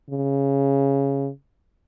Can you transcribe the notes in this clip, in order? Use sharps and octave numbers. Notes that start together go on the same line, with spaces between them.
C#3